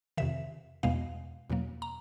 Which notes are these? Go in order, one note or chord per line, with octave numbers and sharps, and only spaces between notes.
F2 C3 D#3 E5
E2 B2 G#3 B3 F5
E2 B2 F#3 A#3
A#5